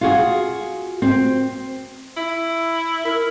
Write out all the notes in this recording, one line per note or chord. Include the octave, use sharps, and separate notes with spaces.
F4 F#4 G#4
C4
E4
E4 A#4